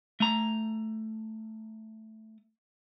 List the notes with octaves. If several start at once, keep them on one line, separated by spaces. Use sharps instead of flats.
A3 A#5